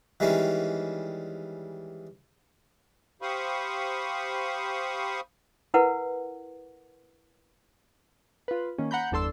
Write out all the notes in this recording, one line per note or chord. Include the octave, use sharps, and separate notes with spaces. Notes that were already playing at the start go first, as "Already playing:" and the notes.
D#3 E3 G3 G#3 C4 C#4
G4 C5 F5 B5 C#6 D#6
E4 A#4 B4 F#5
F4 B4
D#3 A#3 C#4
F#5 A#5 B5 G6
G1 E2 D4 A4 C6 E6